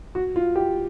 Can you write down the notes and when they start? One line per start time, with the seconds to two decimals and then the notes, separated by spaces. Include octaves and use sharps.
0.15 F#4
0.36 F4
0.56 G4